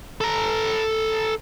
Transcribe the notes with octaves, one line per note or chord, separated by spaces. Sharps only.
A4 A#5